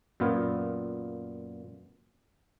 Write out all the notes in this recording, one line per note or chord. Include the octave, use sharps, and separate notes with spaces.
F#2 A#2 B3 F4